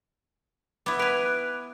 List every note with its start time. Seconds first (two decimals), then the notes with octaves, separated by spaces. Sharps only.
0.86 B3 E4 D6
0.99 B4 G#5 D7 F7
1.25 F#6